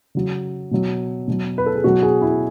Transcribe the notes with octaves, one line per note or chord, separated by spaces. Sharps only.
C#3 F#3
B2 F#3
B2 F#3
B4
A4
G#4
B2 F#3 F#4
G#4
E4